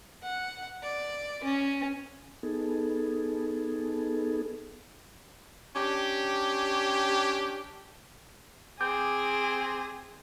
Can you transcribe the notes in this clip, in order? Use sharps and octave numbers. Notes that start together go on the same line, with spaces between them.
F#5
D5
C#4
B3 D#4 G#4 A4
C#4 D4 G4
C4 G#4 D6 G6